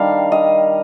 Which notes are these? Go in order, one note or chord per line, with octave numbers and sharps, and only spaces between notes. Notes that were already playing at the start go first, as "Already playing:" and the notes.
Already playing: D#3 G3 D4 F5
D#5